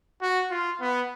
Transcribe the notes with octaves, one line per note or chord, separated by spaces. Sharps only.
F#4
F4
B3